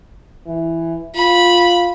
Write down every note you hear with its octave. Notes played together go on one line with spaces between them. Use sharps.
E3
F4 B5